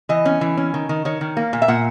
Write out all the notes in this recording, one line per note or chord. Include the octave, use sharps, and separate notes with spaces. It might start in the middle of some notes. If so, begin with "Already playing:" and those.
E3 D#5
C#4
E3
C#4
D#3
D#3
D#3 C#5
D#3
A#3
A#2
E5
A#2 F#5